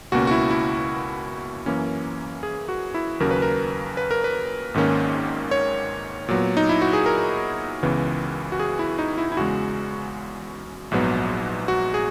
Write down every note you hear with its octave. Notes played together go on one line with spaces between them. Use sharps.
C#2 B2 A#3 C#4 F#4
F#4
E4
E4
F#2 E3 A#3 C#4
G#4
F#4
E4
D#2 C#3 F#3 A#3 C#4 A#4
B4
A#4
B4
A#4
B4
G#1 G#2 D#3 A#3 C#4
C#5
A#2 F#3 B3
D#4
E4
F#4
G#4
A#4
C#2 C#3 E3 B3
F#4
G#4
E4
D#4
E4
E4
E2 C#3 G#3 F#4
A#1 G#2 F#3 B3
F#4
G#4